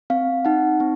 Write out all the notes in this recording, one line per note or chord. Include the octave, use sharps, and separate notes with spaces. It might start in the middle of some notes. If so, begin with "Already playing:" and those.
C4 F5
D#4 F#5
C4